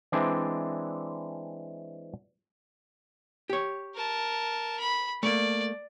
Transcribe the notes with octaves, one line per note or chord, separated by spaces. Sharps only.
E3 G#3 C4 D4 D5
G4 C#5
A#4 A5
B5
A3 A#3 D5